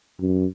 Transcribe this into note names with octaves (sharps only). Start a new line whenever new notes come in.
F#2